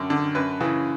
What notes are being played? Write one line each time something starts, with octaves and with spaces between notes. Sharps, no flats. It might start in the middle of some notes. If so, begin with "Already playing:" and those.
Already playing: F#2 D3
D3
F#2 B4
C#3 E3